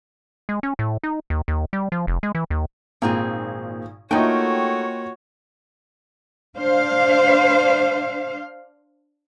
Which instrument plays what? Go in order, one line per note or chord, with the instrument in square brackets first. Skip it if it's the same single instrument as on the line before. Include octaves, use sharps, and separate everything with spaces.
[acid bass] G#3
C#4
A2
D#4
D#2
D#2
G3
F3
F1
G#3
E3
D#2
[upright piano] G#1 [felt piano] A#2 [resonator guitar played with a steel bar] A#3 C4 G#4
[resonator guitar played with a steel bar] A3 D#4 [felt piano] A#3 F4 [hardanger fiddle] F#4 C#5 [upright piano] D#5 G5
[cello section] D4 C5 F5